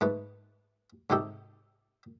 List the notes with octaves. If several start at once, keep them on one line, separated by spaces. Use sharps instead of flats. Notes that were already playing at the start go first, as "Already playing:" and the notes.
G#2 A3 B4
G#2 C3 D#4 G4 A4